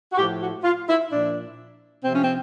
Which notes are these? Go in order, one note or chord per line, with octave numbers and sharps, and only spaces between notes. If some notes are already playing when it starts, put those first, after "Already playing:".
F#4
A2 F3 G4
F#4
F4
E4
A#2 F3 D4
C3 F3 C4
C#4
C4